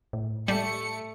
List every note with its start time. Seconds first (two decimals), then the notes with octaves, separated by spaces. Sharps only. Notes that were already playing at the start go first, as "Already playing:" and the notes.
0.13 A2
0.48 G3 A3 C#7